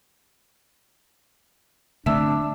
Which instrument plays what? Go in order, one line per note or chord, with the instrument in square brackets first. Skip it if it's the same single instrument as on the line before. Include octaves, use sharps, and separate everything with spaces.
[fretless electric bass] D3 A3 C4 [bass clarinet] D4 [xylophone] E5 A5 E6